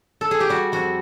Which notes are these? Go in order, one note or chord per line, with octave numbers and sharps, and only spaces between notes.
A4
G#4
G4
G3 F#4
F2 F#4